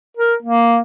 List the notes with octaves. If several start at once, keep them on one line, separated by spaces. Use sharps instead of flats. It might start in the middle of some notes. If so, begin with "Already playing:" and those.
A#4
A#3